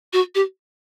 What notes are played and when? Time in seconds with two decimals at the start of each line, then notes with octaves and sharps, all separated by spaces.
0.13 F#4
0.35 G4